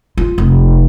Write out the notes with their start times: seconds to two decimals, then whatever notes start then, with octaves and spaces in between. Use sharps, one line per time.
0.18 F4
0.38 F1